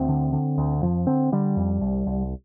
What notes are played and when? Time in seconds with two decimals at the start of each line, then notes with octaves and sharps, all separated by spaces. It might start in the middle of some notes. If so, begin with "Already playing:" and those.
Already playing: D2 C4
0.09 D3
0.33 D3
0.58 D2
0.83 F2 F3
1.07 D3 C4
1.32 D3 G3
1.57 F2
1.81 C2
2.06 C2